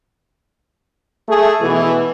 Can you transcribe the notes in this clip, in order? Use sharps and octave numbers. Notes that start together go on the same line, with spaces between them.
A3 G#4
B2 E3